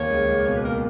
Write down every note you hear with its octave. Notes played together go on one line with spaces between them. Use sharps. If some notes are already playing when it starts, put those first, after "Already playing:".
Already playing: D#2 A#3 C#5
C#2
C#2
B2 C#5
B4
A#3 A#4